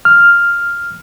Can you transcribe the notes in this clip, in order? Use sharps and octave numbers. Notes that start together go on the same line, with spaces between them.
F6